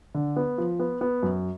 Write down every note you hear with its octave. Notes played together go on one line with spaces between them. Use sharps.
D3
B3
F3
B3
B3
F#2